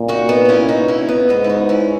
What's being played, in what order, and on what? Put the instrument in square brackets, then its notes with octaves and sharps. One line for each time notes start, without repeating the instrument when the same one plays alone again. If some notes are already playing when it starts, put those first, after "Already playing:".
Already playing: [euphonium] A#2
[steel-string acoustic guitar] D#4 F#4
B3 D#4
D#4
C#4 E4
D#4 F#4
C#4 E4
B3 D#4
[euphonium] G#2 [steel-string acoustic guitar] B3 D#4
[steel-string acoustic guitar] E4
D#4 F#4
C#4 E4